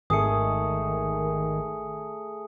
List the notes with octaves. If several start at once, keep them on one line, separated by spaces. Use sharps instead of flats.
G#1 D#3 A3 G#4 D#6 C#7